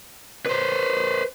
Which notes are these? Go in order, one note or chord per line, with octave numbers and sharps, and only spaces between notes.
B4 C5